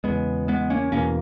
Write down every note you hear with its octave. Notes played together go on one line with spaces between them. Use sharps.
E2 C#3 G#3 B3
G#3 B3
A#3 C#4
E2 B2 A#3 C#4